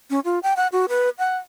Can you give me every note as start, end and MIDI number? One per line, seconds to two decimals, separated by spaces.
0.10 0.20 61
0.25 0.39 65
0.43 0.53 79
0.56 0.67 78
0.72 0.86 66
0.89 1.09 71
1.18 1.37 78